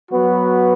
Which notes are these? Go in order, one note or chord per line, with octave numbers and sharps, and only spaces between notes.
F#3 B3 F#4 B4